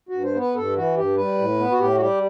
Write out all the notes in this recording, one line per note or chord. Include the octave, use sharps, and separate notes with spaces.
G2 F#4
C5
B3
B4
G2 A4
E3 F#4
G2 G4
G3 B4
A2
B3
F#4
A2 G4
F#4
G3 G4